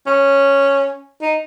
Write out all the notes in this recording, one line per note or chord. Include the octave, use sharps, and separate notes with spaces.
C#4
D#4